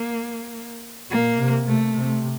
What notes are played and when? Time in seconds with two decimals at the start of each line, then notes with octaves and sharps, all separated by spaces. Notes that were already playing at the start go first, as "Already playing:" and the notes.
Already playing: A#3
1.10 A#2 A#3
1.39 C3
1.67 C3 A3
1.95 C3